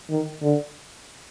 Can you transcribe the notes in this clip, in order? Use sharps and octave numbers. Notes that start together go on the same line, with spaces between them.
D#3
D3